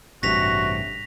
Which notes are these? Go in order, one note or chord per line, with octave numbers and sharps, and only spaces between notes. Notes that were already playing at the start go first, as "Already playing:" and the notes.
A1 G2 C3 F#4 A#6 B6 F7